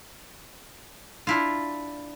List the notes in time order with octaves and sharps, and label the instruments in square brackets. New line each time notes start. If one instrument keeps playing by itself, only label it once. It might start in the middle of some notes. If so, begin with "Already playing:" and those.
[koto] D4 E4 F4